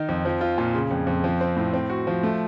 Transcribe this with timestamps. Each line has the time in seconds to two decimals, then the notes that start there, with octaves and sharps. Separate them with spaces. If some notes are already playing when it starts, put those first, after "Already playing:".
Already playing: D#3 D#4
0.09 F2
0.25 F3
0.41 F4
0.58 A#2
0.74 C#3
0.91 F2
1.07 F2
1.24 F3
1.41 C4
1.57 A2
1.74 C4
1.90 F#4
2.07 F3
2.23 A3